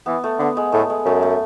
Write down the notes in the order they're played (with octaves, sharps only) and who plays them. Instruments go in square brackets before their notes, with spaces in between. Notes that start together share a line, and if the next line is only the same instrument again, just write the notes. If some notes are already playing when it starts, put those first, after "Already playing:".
[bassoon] E3 [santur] B3
[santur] A3
[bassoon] D3 [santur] B3
[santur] G#3
[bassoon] A2 [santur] A3
[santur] G#3
[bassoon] F#2 [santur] A3
[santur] A3